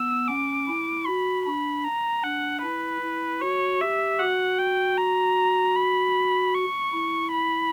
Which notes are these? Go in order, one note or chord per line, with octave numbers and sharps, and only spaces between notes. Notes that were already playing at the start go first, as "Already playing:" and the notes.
Already playing: B3 E6
C#4 D6
E4
F#4 B5
D4 B5
A#5
D4 F#5
E4 B4
E4
F#4 C#5
G4 E5
F#4 F#5
G5
A#5
B5
C#6
E4
B5